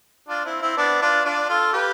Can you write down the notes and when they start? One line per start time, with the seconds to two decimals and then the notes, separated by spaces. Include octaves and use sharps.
0.29 D4 F4
0.45 C4 E4
0.61 C4 E4
0.77 B3 D4
1.01 D4 F4
1.25 D4 F4
1.49 F4 A4
1.73 G4 B4